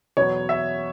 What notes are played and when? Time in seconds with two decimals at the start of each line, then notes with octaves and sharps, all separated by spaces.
0.17 E2 B2 F#3 B3 C#5
0.49 E5